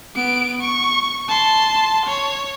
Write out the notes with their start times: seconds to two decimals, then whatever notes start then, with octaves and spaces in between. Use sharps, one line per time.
0.16 B3 D7
0.62 C#6
1.28 A5 C6
2.06 C#5